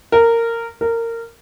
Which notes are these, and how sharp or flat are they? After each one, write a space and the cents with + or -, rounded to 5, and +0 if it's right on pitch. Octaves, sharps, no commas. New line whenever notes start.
A#4 -15
A#4 -20